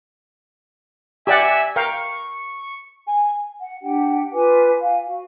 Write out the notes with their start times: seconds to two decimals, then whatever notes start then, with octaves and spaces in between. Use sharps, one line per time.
1.27 G4 D5 E5 F#5 G#5 E6
1.76 A#4 F5 G5 C#6
3.07 G#5
3.58 F#5
3.82 D4 G4 F#5 G5
4.32 F4 B4 G#5 D6
4.80 F5 G#5
5.06 F#4